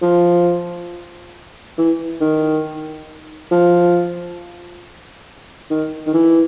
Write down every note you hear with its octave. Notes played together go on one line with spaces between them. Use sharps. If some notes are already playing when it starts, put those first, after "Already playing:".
F3
E3
D#3
F3
D#3
D#3
E3